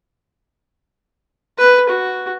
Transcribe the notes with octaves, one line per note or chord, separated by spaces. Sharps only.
B4
F#4